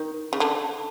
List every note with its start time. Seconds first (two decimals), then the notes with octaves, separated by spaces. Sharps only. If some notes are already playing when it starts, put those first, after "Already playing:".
Already playing: D#3
0.33 C#3
0.40 D3